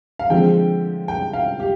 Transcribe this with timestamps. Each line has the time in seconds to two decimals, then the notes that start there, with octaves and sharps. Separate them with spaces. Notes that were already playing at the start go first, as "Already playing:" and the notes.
0.19 F5
0.30 D3 F3 G#3 C4 G5
1.08 G5
1.33 F5
1.60 G4